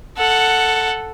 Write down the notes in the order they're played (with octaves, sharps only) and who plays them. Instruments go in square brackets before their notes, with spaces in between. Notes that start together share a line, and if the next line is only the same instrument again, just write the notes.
[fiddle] A4 F#5